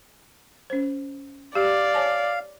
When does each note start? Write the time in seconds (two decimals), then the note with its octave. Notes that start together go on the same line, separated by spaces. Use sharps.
0.70 C#4 C5
1.55 G4 D5 F5
1.94 C#5 G#5 A5